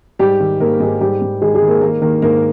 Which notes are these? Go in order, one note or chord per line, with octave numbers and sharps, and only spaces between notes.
G#2 G3 G4
D#3
G#2 A#3 A#4
G#2 G#3 G#4
G#2 G3 G4
G#2
D#3 G#3 G#4
G#3 G#4
D#3
A#3 A#4
D#3 A#3 A#4
D#3 A#3 A#4
G#2 A#3 A#4